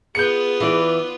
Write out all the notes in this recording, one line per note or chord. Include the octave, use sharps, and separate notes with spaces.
B3 F4 G#4 G6 C#7
E3 D5